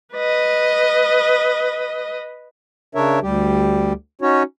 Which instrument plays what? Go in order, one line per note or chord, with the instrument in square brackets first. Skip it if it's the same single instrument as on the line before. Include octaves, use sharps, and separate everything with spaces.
[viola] B4 D#5
[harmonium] C#3 D4 A#4 C#5 E5
D2 G3 G4
C#4 D#4 F#4 C#5